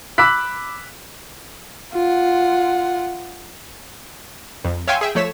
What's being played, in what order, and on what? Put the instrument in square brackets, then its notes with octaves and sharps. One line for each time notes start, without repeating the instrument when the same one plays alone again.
[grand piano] B5 D6 E6 F#6 B6
[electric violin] F4 F#5
[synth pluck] F2
C#5 E5 F5 G5 G#5 C6
G#4 E5 G5
F3 A3 C#5 B6 E7